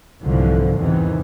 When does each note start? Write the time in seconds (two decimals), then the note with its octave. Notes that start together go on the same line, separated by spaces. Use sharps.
0.22 C2 G#2 D3 E3 F3
0.79 E2 C3 D#3 E3